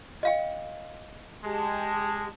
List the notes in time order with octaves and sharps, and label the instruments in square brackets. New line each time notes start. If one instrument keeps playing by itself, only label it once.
[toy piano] D#5 F5 G5
[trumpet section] G#3 [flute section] G4 A5